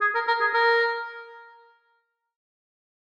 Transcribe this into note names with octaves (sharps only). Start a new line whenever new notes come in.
G#4
A#4
A#4
G#4
A#4